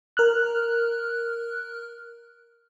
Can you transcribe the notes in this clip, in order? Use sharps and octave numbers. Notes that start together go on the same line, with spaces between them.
A#4 F6 F#6